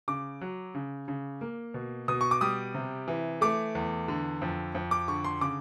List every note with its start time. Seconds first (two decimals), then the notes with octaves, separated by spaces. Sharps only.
0.08 C#3 D6
0.41 F#3
0.75 C#3
1.08 C#3
1.41 A#3
1.74 B2
2.08 B2 D#6
2.21 C#6
2.31 D6
2.41 G3 D#6
2.74 C3
3.08 E3
3.41 A3 D6
3.75 E2
4.08 D3
4.41 F2
4.75 F2
4.91 D6
5.08 D3 C#6
5.24 C6
5.41 C#3 D6